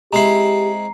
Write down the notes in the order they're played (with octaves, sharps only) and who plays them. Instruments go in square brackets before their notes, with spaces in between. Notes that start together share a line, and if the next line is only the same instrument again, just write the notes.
[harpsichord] G#3 C4 E4 [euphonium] G4 [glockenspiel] A#5 C7